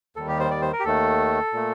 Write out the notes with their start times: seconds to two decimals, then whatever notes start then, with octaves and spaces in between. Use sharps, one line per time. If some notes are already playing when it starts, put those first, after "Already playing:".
0.16 D#2 D#3 G3 A4
0.28 G4
0.40 C5
0.51 D5
0.62 C5
0.73 A#4
0.80 G4
0.85 D#2 D#3 A3 A4
1.53 A#2 A3